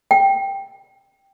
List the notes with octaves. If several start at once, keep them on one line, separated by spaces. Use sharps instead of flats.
G5